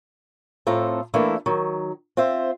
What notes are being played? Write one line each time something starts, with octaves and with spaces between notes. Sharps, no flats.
A2 C4 F4 A4 A#5
E3 A3 A#3 D4 E4
D#3 F#3
C4 F4 C5 E5